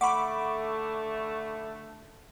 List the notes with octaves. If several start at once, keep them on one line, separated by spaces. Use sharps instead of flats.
D3 A3 F#5 B5 C#6 D6